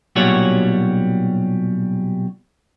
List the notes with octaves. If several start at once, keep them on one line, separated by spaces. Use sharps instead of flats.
B1 A#2 G3 C#4 F#4 C#5